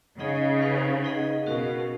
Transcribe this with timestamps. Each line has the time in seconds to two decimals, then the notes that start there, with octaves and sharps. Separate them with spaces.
0.19 C#3 D#4 G#4 D#5 F#5
0.62 D#4 G#4 B4 F5
1.04 D#4 G#4 D#5 F#5
1.46 B2 C#4 F#4 A#4 F5